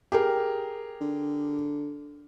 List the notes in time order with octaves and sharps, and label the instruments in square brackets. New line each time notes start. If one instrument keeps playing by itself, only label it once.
[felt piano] G4 G#4 A#4
[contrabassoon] D3